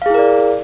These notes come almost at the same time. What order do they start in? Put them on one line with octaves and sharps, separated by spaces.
F5 G#4 E4 A#4 D5